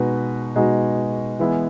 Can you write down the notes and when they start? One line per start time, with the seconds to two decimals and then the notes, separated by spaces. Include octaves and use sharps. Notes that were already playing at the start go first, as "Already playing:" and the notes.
Already playing: B2 G#3 D#4 F#4 B4
0.55 B2 G#3 D#4 F#4 B4
1.39 E3 G#3 B3 E4 B4